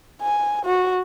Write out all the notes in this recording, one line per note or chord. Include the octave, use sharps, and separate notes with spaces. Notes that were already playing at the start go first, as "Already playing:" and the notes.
G#5
F#4